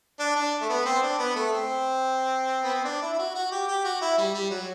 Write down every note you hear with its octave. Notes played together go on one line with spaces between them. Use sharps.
D4
D4
A3
B3
C4
D4
B3
A3
C4
B3
C4
D4
E4
E4
F#4
F#4
G4
G4
F#4
E4
G3
G3
F#3